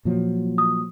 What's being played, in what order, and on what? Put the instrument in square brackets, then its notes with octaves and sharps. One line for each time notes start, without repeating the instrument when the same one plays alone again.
[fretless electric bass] A#2 F3 F#3
[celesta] D#6